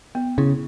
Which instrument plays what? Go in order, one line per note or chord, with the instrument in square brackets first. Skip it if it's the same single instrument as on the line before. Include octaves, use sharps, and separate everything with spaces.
[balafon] B3
[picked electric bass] C#3 [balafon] E4